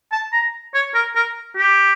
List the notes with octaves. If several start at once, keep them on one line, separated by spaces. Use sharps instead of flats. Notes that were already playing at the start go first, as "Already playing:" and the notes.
A5
A#5
C#5
A#4
A#4
G4